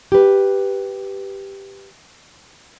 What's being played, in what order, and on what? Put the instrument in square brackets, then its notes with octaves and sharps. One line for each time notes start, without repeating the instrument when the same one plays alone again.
[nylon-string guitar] G4 B4